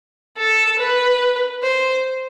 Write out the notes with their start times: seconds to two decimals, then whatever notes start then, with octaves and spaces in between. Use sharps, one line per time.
0.37 A4
0.79 B4
1.63 C5